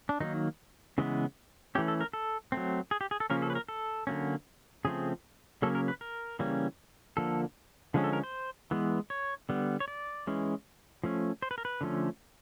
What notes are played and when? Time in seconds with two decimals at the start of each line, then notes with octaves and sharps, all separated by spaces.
0.09 D4
0.20 D#3 F#3 A#3 D#4
0.98 C#3 E3 G#3 B3
1.75 E3 A3 C#4 G4
1.88 A4
2.01 A#4
2.13 A4
2.52 F#3 A3 C4
2.91 G#4
3.01 G4
3.11 G#4
3.20 A4
3.30 C#3 F3 A#3 C#4 A#4
3.42 A4
3.50 B4
3.55 A#4
3.68 A4
4.07 D3 F#3 A#3 C#4
4.85 C#3 F3 A3 C4 G#4
5.62 C#3 F#3 A#3 C#4 A4
5.75 A#4
5.88 B4
6.01 A#4
6.39 C#3 E3 G3 A#3 C#4
7.17 D3 F3 A#3 A4
7.94 D3 F3 G#3 C#4
8.04 A4
8.13 A#4
8.23 C5
8.71 E3 G#3 B3
9.10 C#5
9.49 D3 G3 B3
9.80 C#5
9.88 D5
10.27 E3 G#3 C#4
11.04 F3 A3 C#4
11.42 C5
11.51 B4
11.58 A#4
11.65 B4
11.81 D3 F3 A3 C#4